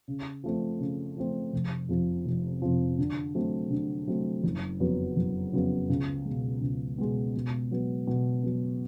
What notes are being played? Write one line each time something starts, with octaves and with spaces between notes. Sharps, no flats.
C#3
F3 A3 C4
C#3
F3 A3 C4
F1
F2 C3 F3
F1
F2 C3 F3
D3
F#3 A3 C4
D3
F#3 A3 C4
F#1
F2 C#3 F#3 B3
F#1
F2 C#3 F#3 B3
C#2
B2 G#3
C#2
B2 G#3
B2
F#3 B3
B2
F#3 B3